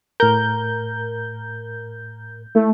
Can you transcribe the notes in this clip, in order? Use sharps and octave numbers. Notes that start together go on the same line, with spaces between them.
A2 A#4 A#5 G6
A3 E4